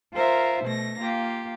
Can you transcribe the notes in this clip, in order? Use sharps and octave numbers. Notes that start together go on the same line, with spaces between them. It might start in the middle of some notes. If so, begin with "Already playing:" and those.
F4 A#4 C5 E5
B2 A3 A#6
A#3 F4 G4